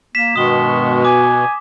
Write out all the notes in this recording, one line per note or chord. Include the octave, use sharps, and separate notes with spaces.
A#3 B6 E7
G2 B2 D#3 G#3 D#6 G7
G#5 D6